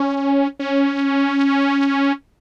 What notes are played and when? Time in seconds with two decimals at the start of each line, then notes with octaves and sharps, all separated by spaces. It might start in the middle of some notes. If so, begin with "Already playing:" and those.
Already playing: C#4
0.59 C#4